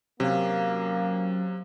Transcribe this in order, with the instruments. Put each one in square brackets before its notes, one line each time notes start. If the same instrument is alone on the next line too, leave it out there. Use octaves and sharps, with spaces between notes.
[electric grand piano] C3 [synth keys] F#3 C#4 F5 [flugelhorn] A#3